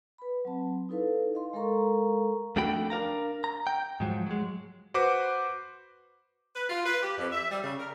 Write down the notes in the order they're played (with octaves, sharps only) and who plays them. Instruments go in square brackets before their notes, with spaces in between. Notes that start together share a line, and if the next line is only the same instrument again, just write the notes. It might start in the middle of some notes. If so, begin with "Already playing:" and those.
[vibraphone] B4 B5
F#3 C4 A5
D#4 E4 A4 B4 F5
D#5 F5 C6
G#3 A4 A#4 F5 A#5 C#6
[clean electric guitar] F2 A3 D4 F#4 G5 B5
D4 A#4 F5 A#5
A#5
G5
G#2 F3 F#3
F#3 G#3
[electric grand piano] F#4 B4 C5 D6
[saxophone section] B4
F4
B4
G4
F2
E5
G3
C#3
A#4